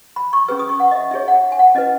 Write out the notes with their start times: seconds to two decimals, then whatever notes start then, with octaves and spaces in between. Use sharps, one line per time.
0.16 B5
0.33 C#6
0.48 C#4 G#4 B4 E6
0.59 D#6
0.69 C#6
0.80 F#5
0.91 D#5
0.95 E5
1.11 D#4 E5
1.14 G#4 C#5
1.28 F#5
1.52 G#5
1.59 F#5
1.75 C#4 E4 B4 D#5